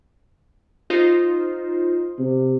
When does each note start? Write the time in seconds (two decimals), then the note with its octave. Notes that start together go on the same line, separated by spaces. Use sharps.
0.90 D#4 F4 C5
2.19 C3